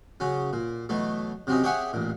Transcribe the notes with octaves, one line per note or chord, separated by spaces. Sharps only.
C#3 F#3 C#4
A#2
B2 E3 F#3 A3
C3 F#3 C4 C#4 D#4
G4 G#4 C#5 E5 F#5 G#5
A1 A#2